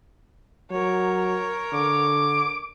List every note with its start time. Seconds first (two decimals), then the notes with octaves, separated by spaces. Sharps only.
0.71 F#3 A#4 C#5
1.73 D3 D6